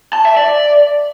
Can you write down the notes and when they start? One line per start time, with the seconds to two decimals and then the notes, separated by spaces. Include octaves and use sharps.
0.13 A5
0.25 E5
0.37 D5